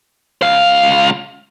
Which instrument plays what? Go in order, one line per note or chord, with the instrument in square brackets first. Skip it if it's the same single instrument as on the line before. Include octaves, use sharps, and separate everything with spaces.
[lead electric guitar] C#2 F5